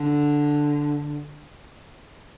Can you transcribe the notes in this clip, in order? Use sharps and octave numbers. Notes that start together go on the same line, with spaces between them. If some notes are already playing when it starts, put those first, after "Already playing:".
Already playing: D3